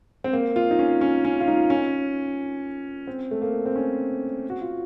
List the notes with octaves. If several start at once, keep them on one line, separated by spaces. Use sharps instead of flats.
C4
A#3
F4
D#4
C#4
C#4
C#4
F4
D#4
C#4
C4
A3
A#3
C4
C#4
F#4
F4